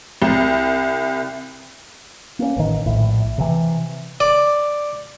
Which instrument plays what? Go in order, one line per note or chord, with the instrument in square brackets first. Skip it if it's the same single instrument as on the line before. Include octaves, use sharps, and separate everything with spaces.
[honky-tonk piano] C2
[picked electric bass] A#3 C#4
A1 D#3
A#1 A2
C3 E3
[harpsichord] D5